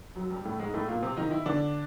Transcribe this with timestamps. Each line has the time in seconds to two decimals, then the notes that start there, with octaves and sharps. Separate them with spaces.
0.16 F#2 F#3
0.31 G2 G3
0.45 A2 A3
0.59 G#2 G#3
0.74 A2 A3
0.88 A#2 A#3
1.02 C3 C4
1.17 D#3 D#4
1.31 E3 E4
1.46 D3 D4